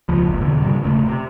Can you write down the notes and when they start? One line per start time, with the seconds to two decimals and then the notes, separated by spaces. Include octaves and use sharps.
0.09 E1 C#2 B2 F3
0.23 F#1 C#2
0.41 E2 B2 D3 E3
0.61 G#2 C#3 G3
0.83 E1 C#3 G#3 A3
1.06 C3